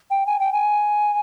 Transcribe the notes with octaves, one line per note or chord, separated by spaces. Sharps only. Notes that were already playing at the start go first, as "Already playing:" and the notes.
G5
G#5
G5
G#5